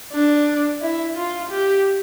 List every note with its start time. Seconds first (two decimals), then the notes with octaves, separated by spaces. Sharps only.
0.13 D4
0.81 E4
1.16 F4
1.50 G4